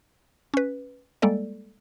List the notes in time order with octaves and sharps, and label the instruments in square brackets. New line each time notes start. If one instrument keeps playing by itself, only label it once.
[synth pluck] C#4 B4
G3 G#3 A#3 A4 D5